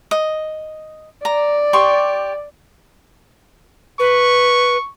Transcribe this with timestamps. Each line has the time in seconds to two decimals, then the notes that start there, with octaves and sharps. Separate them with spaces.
0.11 D#5
1.25 D5 A#5
1.73 G4 C6 C#6
3.99 B4 C#6